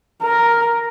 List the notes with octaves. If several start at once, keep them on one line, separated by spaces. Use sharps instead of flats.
A#4